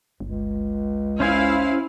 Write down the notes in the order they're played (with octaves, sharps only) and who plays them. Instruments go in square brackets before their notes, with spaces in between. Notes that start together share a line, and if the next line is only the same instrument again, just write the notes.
[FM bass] G1 [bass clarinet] C#2
[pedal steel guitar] C#4 C5 G#5 [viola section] E4 F5